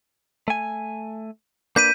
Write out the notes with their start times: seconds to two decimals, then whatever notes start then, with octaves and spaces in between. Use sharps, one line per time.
0.48 A3 G#5
1.76 A#3 D4 B4 G6 B6 D#7